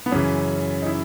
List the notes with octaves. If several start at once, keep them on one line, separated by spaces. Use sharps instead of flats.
B3
F#2 C#3 E3 C#4
D#4
E4